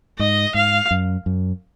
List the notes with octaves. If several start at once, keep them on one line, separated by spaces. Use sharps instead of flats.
G#2 D#5
G#2 F5
F#2
F#2